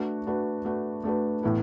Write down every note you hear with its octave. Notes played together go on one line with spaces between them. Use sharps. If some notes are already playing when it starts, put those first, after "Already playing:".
Already playing: A3 D4 F#4 B4
A3 D4 F#4 B4
A3 D4 F#4 B4
A3 D4 F#4 B4
A2 E3 B3 E4